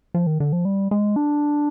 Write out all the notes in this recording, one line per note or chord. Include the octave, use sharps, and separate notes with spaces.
F3
D#3
D3
F3
G3
G#3
D4